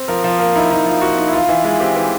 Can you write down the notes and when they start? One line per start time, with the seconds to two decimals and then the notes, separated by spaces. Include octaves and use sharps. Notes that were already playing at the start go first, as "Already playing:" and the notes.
Already playing: C4
0.08 F3 A#4
0.24 F3
0.39 A#3 A#4
0.55 D#4 E4
0.71 F3 D#4
0.86 F3 F4
1.02 A#3 F#4
1.18 D#4
1.28 E4
1.33 E3 F4
1.48 E3 E4
1.64 G#3 F4
1.80 C4 G4
1.96 E3